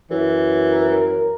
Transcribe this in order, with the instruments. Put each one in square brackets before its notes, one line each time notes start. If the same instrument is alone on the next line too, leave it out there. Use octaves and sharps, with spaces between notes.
[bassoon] F#2 [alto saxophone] E3
[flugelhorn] A#4